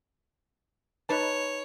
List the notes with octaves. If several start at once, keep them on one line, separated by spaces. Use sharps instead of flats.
D#4 B4 C#5 A5